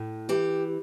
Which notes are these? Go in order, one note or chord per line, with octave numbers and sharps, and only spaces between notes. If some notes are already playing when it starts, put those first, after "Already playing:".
Already playing: A2
E3 G4